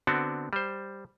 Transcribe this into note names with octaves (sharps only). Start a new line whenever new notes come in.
D3 B3 C4 D4 F#4
G3 C5